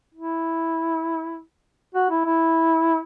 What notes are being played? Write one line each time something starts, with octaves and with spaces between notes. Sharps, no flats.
E4
F#4
E4
E4